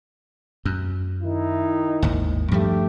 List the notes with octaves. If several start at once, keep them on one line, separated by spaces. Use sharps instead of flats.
F#2
D#3 D#4 E4
G#1 D#2 A2
G2 F3 G3 A3 G4